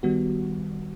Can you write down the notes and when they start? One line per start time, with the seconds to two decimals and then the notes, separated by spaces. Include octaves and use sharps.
0.03 D#3 G3 B3 F#4